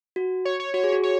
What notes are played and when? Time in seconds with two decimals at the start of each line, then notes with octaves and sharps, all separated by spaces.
0.16 F#4
0.45 C#5
0.60 C#5
0.74 F#4 C#5
0.84 G#4
0.92 F#4
1.03 C#5